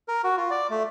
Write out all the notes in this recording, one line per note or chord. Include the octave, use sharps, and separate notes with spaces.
A#4
F#4
F4
D5
A3